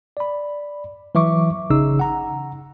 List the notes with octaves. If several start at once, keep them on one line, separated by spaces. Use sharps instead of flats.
D5 B5
E3 F#3 E5 C#6 D6
A1 C#3 D#4 E6
F#5 A#5